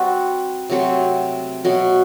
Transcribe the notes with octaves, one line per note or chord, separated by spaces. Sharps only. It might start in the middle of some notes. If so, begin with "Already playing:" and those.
Already playing: G3 C4 F#4 B4
C3 F#3 A3 C4
B2 F#3 A3